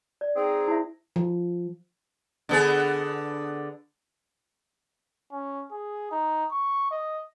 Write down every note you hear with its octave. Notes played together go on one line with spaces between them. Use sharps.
D5
C4 D#4 G#4
E4 E5
F3
D3 B3 G#4
C#4
G#4
D#4
C#6
D#5